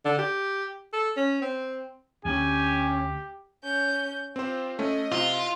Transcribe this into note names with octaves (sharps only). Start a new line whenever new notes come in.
D3
G4
A4
C#4
C4
D2 C#4 G4 G#5
C#4 G6
C4 F4 G4 C5
A3 C#4 D#5
C3 F4